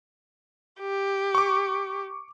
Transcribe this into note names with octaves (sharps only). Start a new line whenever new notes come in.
G4
C#6 D6